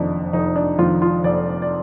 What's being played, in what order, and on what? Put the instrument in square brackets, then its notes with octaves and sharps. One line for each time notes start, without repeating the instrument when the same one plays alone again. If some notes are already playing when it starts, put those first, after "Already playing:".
Already playing: [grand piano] F1 F2 D#3 D4 D#4
F1 D#4
D4
F2 D#3 F4
F4
F1 D5
D5